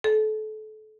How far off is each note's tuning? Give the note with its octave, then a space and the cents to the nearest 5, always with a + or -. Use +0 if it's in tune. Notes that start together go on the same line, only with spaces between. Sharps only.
A4 -30